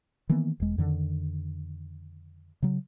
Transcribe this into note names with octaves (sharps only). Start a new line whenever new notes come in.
D#3 E3 A#3 B3
E1 E2 G#3
F2 D3 D#3
C#3 F#3